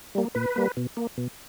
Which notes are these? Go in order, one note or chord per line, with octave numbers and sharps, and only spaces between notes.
G3 A#3
A#2 B4
G3 A#3
B2
A#3
B2